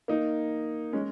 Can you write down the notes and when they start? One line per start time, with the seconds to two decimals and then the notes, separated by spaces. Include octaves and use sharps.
0.08 A#3 D#4
0.93 G#3 C#4